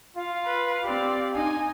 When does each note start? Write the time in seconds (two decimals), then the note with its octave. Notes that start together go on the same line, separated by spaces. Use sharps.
0.16 F4 F5
0.45 B4
0.84 C4 G4 D5
1.35 D#4 G#5